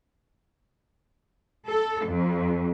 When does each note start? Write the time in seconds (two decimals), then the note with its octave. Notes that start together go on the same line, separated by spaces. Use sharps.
1.67 A4
2.06 F2